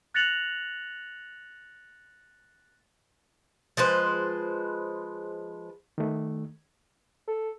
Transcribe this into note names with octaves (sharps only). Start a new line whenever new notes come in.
F#6 A6 A#6 C#7 F7 F#7
F3 G#3 B4 C5
D#3 A3
A4